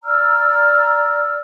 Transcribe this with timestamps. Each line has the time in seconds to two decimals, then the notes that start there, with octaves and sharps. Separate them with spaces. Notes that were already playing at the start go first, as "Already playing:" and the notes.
0.04 D5 A#5 E6 F6